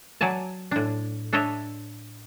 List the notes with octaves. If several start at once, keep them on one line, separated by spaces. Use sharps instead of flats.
F#3 D5 G#5 A5
A2 D4
D4 A4 C#5 D#5 E5